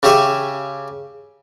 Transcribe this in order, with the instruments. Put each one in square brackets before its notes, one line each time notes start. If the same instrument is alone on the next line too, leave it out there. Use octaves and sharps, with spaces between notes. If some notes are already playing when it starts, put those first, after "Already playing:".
[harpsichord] C#3 C#4 G4 C#5 E5 G#5